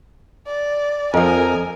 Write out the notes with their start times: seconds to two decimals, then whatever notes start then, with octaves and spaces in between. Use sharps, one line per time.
0.47 D5
1.14 F2 F3 A4 A#4 D#5 G#5